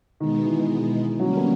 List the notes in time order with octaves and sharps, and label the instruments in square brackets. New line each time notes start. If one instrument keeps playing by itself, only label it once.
[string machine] B2 G#3 B3 [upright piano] D#3
[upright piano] E3
[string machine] D3 G3 A#3 C#4 [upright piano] F#3
[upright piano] B3